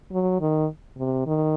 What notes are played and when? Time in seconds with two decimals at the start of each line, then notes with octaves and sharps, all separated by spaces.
0.12 F#3
0.41 D#3
0.98 C3
1.26 D#3